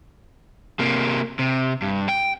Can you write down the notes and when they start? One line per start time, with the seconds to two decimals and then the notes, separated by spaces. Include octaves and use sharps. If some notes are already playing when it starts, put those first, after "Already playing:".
0.79 C3 A#3
1.39 C3
1.82 G2
2.09 G5